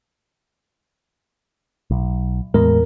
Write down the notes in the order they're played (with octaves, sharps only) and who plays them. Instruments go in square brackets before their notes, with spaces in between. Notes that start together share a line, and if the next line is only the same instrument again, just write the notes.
[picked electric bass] B1
[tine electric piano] E2 A#4 [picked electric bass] A2 G#3